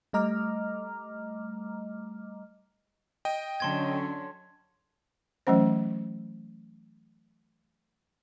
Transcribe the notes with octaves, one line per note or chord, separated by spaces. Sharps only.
G3 A3 D#5 A#5 D6 F6
D#5 G5
D3 F#3 C#4 A5 C6 G#6
E3 F#3 A3 C#4 C5